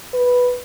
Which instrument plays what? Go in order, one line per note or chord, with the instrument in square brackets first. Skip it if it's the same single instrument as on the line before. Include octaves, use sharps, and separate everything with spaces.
[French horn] B4